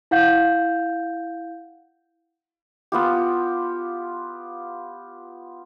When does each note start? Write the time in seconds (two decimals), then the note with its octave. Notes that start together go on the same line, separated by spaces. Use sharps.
0.11 E4 F5 F#5 G6
2.92 B3 F4 G4